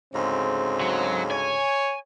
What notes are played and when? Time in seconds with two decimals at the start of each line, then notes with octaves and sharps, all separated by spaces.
0.13 D2 G#2 C#3 C4
0.81 F#3
1.31 C#5 G#5